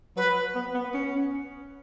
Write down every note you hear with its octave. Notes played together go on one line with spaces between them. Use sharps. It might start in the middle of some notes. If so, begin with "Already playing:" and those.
F#3 B4
B3
B3
C#4